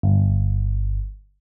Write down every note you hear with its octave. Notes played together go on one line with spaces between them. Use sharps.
G1